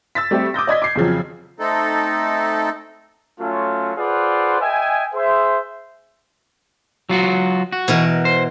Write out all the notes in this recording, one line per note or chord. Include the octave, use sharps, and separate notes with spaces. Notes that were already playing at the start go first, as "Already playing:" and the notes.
E6 A6 B6
G3 A3 C4 G4
D6 D#6 G6 A#6
D5 D#5 G#6 B6
D6 C7
F2 C#3 F3 F#3
A3 C4 D#4 A4
F#3 A3 C#4 F4
F4 G#4 B4 C5 D5 F#5
D#5 E5 G5 G#5
G#4 C5 E5
F#3 F4 F#4
F#4
B2 E3 A#4
C5